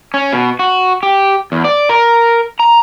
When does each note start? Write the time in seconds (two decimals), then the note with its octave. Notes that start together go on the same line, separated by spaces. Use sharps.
0.14 C#4
0.33 B2
0.59 F#4
1.03 G4
1.52 E2
1.65 D5
1.89 A#4
2.60 A#5